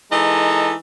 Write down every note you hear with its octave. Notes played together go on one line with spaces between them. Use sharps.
E3 G#3 D#4 A4 A#4